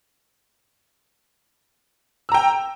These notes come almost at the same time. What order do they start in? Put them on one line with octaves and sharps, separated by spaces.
E6 A#5 G5